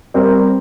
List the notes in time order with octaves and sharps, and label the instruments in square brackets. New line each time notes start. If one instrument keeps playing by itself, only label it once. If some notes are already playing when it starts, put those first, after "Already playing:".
[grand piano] G3 C4 G4 A#4